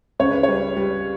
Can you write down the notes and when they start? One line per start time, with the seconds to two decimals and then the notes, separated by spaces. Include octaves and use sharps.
0.19 C#2 C#5
0.31 B4
0.43 G3 C#5
0.77 G3